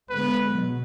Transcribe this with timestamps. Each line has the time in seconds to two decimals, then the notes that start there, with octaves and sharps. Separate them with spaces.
0.10 D3 G#3 B3 B4
0.53 B2 F#3